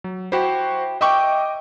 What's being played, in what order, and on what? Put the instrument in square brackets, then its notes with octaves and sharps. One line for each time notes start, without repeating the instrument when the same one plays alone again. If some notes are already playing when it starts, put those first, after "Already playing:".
[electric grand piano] F#3
[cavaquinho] E4 G4 [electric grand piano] F#4 C5
[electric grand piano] D#5 D6 [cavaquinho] E5 G5 C#6